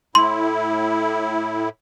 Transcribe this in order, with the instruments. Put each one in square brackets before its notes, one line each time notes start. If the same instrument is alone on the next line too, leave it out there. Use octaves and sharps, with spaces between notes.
[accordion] A2 E4 [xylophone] C6